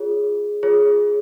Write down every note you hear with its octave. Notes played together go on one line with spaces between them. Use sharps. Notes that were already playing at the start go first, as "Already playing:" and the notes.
Already playing: F4 G#4 C#5
F4 G#4 C#5